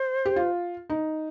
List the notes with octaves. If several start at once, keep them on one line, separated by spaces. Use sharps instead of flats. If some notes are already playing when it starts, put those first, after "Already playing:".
Already playing: C5
G4
F4
D#4